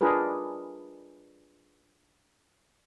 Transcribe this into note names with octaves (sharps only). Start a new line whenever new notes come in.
D4 F4 G#4 A#4 B4